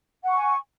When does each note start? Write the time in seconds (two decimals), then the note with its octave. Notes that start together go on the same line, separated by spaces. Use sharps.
0.23 F#5
0.28 C#6
0.33 G#5